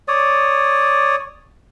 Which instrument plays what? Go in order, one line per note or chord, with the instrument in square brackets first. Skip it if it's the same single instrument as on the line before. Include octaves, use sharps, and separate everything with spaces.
[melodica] C#5 D5 D#6